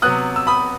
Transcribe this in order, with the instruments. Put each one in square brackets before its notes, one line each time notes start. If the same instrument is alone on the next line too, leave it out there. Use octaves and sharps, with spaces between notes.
[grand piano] C3 F#3 B3 D#6 F#6
E6
B5 D#6